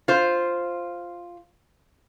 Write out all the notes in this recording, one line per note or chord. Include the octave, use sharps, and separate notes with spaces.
F4 C5